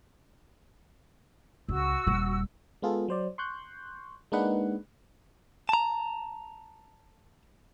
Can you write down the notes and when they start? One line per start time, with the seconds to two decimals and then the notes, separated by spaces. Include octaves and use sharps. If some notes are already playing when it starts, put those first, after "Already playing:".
1.69 C#2 F#4 E6
2.07 D#1 G3
2.82 G#3 B3 F4 G#4 A4
3.08 F#3 C5 D5
3.38 C6 C#6 F#6 G6
4.32 G#3 A#3 D4 D#4 B4 F#5
5.69 A5 A#5